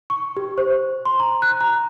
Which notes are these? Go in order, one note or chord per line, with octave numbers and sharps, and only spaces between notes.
C#6
G4
C5
C6
A#5
F#6
A#5